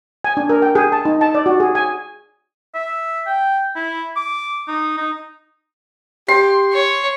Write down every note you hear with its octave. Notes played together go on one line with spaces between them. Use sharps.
G#5
D4
A#4
G5
G#4
A5
D#4
A5
D5
F#4
G#4
G#5
E5
G5
E4
D6
D#4
D#4
G4 C6
C#5